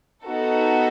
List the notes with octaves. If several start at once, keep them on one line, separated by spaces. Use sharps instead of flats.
B3 D#4 F#4 A4